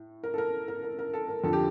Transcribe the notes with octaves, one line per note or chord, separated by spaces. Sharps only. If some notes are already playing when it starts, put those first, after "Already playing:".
Already playing: A2
A#4
A4
A#4
A#4
A#4
A#4
A4
A#4
F2 D3 F3 A4
G4